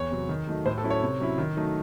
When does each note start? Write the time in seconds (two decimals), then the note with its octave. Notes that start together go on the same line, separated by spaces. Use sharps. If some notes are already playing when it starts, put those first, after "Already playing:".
Already playing: E2 C#5
0.11 C3 F#3
0.29 D#3
0.47 F#3 A3 D#4
0.66 A2 C5
0.78 A4
0.84 F#3 C#4 E4
0.90 C#5
1.03 C3
1.20 F#3 C#4 E4
1.38 D#3
1.57 F#3 A3 D#4